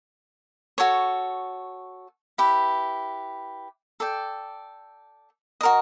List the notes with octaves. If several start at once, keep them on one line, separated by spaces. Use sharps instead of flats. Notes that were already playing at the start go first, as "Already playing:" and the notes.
F#4 A4 C#5
E4 G4 B4
A4 D5 G5
F#4 A#4 D#5